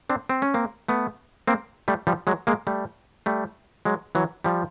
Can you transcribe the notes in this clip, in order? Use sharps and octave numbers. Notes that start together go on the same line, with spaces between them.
C4 D4
C4
C#4
A#3 C4
A3 B3
A#3 C4
G3 A3
F3 G3
F#3 G#3
G#3 A#3
G3 A3
G3 A3
F#3 G#3
E3 F#3
F3 G3